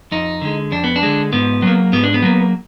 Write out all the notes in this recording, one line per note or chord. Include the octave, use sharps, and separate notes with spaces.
F2 D#4
D3 G#3
F2 D4
B3
D4
D3 G#3
G#2 B3
F#3 A#3
G#2 B3
D4
B3
F#3 A#3